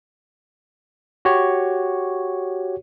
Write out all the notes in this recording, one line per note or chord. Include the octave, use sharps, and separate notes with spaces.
F#4 G4 C#5